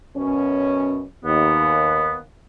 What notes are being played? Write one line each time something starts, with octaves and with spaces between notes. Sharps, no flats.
F#2 B2 C#4
D#2 B3